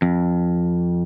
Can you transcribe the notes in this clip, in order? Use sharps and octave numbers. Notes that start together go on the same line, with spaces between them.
F2